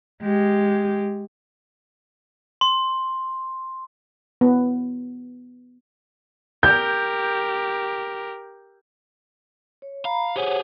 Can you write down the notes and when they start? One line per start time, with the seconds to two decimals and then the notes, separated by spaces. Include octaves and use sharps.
0.22 G#3 G4
2.61 C6
4.41 B3
6.63 G4 A#4 G6
9.82 C#5
10.05 F5 A#5 B5
10.36 G4 G#4 C5 C#5 F#5